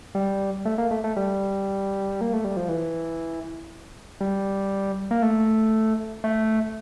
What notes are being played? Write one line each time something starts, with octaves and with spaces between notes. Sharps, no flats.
G3
A3
A#3
A3
A3
G3
A#3
A3
G3
F3
E3
G3
A#3
A3
A3